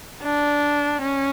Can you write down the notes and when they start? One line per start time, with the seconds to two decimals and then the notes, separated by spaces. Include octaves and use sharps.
0.22 D4
1.02 C#4